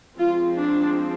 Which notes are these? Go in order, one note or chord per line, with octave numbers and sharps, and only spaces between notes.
F3 G#3 C4 F4
D4